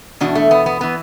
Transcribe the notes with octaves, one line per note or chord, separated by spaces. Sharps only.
E2 B2 D4 F#4
A3
B3
B3
E3 B3